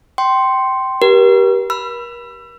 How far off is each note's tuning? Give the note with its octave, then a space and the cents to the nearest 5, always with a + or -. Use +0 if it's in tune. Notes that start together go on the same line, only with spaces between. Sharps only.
G5 -20 C6 +0
G4 -10 A#4 +40
B5 +0 E6 +35